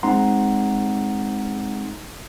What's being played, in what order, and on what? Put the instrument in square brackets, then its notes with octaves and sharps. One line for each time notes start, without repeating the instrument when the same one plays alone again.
[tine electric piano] G#3 C4 D#4 F#5 A#5 C6